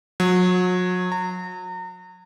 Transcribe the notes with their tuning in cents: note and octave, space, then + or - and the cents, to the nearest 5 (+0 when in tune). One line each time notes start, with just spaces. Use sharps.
F#3 -35
A#5 -35